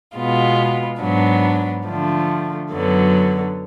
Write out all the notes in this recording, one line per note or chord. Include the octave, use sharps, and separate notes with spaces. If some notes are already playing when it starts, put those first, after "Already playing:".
B2 G#3 B3 F4
G#2 F#3 B3 D4
D3 F3 A3
F#2 D3 F#3 B3